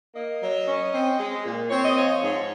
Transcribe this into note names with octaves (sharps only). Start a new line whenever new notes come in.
A#3 D#5
F#3
C#4
C4
G#3
A#2
C4 C#5
D#5
F3 C#5
G#2